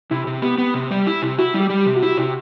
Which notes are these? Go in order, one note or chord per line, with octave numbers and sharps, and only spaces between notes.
C3 E4
C3
B3 G4
B3
C3
G3
E4
C3
E4 F#4
G3
G4
G3
G4
C3
F#4
E4 G4
C3